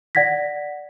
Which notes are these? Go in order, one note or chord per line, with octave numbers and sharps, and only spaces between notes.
D5 F#5 G#6 A#6 B6